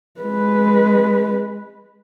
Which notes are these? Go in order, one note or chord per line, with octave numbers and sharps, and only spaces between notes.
G#3 B4